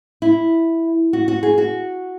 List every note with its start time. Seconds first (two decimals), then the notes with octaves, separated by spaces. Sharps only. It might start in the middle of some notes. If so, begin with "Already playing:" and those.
0.22 E4
1.13 F#4
1.28 F#4
1.43 G#4
1.58 F#4